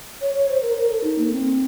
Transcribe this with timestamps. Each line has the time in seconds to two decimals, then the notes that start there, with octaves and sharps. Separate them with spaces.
0.21 C#5
0.34 C#5
0.49 C5
0.62 A#4
0.77 A#4
0.90 A4
1.04 D#4
1.19 A#3
1.32 C4